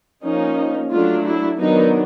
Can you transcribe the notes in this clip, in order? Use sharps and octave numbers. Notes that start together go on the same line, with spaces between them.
F3 A#3 C#4 D#4
F#3 A3 D4 F4
E4
D#3 F#3 B3 D4 D#4